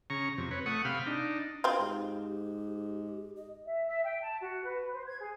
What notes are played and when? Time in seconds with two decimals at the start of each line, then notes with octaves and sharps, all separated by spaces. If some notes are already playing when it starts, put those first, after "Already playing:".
0.10 C#3 A#5 C#6
0.38 F2 C3
0.51 B4 C#5
0.66 A3 F#5 C#6 D#6
0.85 C3 F5 G5 B5 F6
1.06 D4 D#4
1.64 C4 F4 F#4
1.80 G#2 G4
3.36 D#5
3.66 E5
3.88 E5
4.03 G5
4.21 A5
4.40 F#4
4.64 B4
4.93 C5
5.06 G#6
5.19 G#4